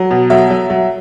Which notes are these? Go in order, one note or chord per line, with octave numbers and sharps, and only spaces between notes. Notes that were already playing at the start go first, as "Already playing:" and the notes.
Already playing: F#3
B2
F#3 E5
F#3
F#3